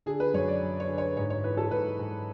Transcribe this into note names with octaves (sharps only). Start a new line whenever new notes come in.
D3 G#4
B4
F#2 C#5
D5
F#2
C#5
D3
C#5
G#2 C#5
C#5
E3 B4
A4
G#2 B4
G#2